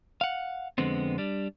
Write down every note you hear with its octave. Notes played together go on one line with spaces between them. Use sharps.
F5 F#5
F2 D3 G#3 B3 C4
G3 D4